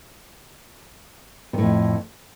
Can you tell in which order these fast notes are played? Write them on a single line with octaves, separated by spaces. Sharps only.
C3 A2 F2